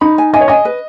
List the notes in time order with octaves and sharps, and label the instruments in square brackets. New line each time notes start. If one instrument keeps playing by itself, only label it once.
[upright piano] D#4 [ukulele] B5
[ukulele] G#5
[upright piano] D#5 [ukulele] G#5
[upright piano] C#5
[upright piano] D#5 [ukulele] G#5
[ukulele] B4